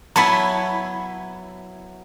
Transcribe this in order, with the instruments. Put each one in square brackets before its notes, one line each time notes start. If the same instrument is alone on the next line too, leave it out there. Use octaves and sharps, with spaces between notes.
[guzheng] F#3 B3 E4 [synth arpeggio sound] A5 B5